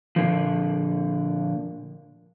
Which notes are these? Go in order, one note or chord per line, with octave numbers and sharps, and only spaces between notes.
A#2 D3 F3